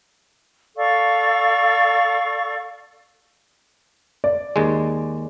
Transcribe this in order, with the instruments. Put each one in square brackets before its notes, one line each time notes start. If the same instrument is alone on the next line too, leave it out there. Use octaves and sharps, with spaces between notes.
[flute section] A4 D5 F5 C#6
[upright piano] D5
[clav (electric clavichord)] D#2 G#3